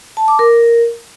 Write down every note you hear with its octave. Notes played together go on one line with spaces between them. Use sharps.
A5
D6
A#4